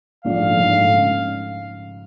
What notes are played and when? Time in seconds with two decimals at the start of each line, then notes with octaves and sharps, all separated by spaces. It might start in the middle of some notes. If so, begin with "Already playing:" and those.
0.25 A#1 G#2 F3 A3 D4 F5
0.57 A#1 G#2 F3 A3 D4
0.90 C#3